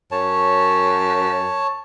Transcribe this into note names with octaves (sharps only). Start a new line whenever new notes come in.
F#2 C#5 A5